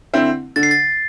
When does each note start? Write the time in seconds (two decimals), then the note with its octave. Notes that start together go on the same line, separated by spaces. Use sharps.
0.13 D3 C4 E4
0.56 D3 A6
0.63 C7
0.71 A6